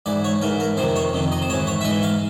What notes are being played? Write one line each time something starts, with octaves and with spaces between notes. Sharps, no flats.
G#2 E3 D5
C#5
G#2 E3 A#4
A#4
F2 C3 D#3 C5
C#5
F2 C3 D#3
D#5
C5
G#2 E3 C#5
C#5
E5
G#2 E3 D#5
F5